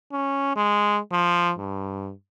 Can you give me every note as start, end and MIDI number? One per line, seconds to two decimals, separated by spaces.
0.12 0.55 61
0.56 0.99 56
1.12 1.53 53
1.58 2.12 43